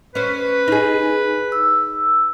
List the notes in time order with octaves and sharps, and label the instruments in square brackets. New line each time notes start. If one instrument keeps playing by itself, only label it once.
[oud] C#4 C5 [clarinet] B4
[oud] D#4 G#4
[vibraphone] E6